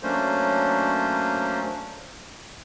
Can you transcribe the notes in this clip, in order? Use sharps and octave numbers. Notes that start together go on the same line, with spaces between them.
F#3 A3 A#3 C#4 D4 C5